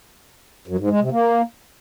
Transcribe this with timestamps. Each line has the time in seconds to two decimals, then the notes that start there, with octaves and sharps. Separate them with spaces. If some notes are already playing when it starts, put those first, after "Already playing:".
0.68 F#2
0.79 G#2
0.90 G#3
1.01 C3
1.12 A#3